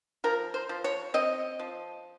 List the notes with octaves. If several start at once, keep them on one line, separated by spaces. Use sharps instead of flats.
F3 A#4
C5
F3
C#5
C4 D#5
F3